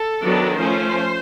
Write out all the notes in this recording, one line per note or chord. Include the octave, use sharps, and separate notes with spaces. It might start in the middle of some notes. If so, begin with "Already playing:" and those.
Already playing: A4
D#3 F#3 B3 D4
F3 A3 C#4 C5